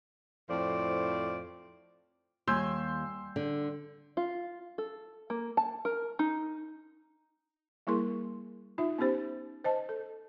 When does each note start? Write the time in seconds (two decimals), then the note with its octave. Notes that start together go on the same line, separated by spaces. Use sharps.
0.49 F2 A2 F3 C5 D5
2.47 D#2 G3 G#5 C6 E6 G6
3.36 D3
4.17 F4
4.78 A4
5.30 A#3
5.57 A5
5.85 A#4
6.19 D#4
7.87 G3 A#3 E4 G#4 A#4 C6
8.78 D#4 F4 E5
8.98 B3 C#4 D#4 G4 C5
9.64 C5 D#5 A5
9.89 A4